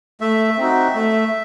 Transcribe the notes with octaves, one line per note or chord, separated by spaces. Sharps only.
A3 E5
C4 D#4 F#4
A3